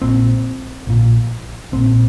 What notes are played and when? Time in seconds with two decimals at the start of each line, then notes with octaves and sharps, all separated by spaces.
0.02 A#1 A#2 C4
0.87 A#1 A#2
1.72 A#1 A#2 C4